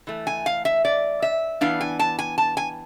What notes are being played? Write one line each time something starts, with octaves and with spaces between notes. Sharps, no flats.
E3 A3
G#5
F5
E5
D5
E5
E3 B3 D4 F5
G#5
A5
G#5
A5
G#5